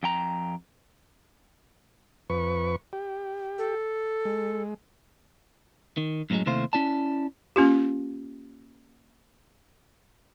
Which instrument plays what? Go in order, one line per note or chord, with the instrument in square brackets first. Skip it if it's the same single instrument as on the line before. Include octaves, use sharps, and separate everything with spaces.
[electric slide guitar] F2 G5 A#5
[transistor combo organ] F2 B4 C#6
G4
[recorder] A4
[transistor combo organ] G#3
[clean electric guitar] D#3
F#2 A2 E3 F#3 G#3
D#2 C3 A3 E4 C5 F5
C#4 E4 D5 A5
[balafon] A#3 C#4 F4 G4